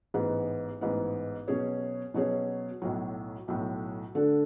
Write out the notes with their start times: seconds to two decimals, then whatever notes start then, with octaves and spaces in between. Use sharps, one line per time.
0.14 A1 G#2 G#3 B3
0.81 A1 G#2 G#3 B3
1.48 B2 F#3 C#4 G#4 C#5
2.14 B2 F#3 C#4 G#4 C#5
2.82 B1 A2 F#3
3.48 B1 A2 F#3
4.15 D3 A3 D4 F#4 A4